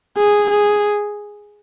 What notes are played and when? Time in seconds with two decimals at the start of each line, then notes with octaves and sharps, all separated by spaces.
0.18 G#4
0.50 G#4